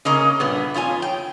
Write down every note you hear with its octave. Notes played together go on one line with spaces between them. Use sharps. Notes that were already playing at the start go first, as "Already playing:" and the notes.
C#3 A#3 C#4 D#5 A#5
G2 A#2 B3
F2 F4 C#5 G#5
G5